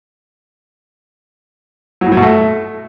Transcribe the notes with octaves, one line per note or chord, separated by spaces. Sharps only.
F#3
A2
F#3
B2
A3